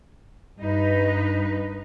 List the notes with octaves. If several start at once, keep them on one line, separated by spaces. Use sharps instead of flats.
G2 D#4 B4